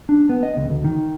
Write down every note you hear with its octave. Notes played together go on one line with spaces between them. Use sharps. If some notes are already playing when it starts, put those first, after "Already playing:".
D4
B3
D#5
C#2
D2
D#3